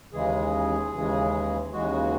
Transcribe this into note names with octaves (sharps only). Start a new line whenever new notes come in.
D#2 C#3 E3 G#3 G#4
D#2 C#3 E3 G#3
D#2 C#3 E3 G#3 F#4